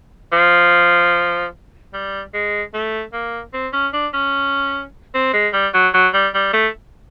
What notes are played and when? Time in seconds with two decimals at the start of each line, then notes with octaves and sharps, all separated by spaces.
0.33 F3
1.93 G3
2.34 G#3
2.74 A3
3.13 A#3
3.54 C4
3.73 C#4
3.93 D4
4.13 C#4
5.14 C4
5.34 G#3
5.53 G3
5.74 F#3
5.94 F#3
6.14 G3
6.34 G3
6.54 A3